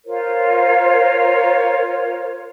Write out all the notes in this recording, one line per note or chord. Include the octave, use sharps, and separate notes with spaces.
F4 A#4 C5 C#5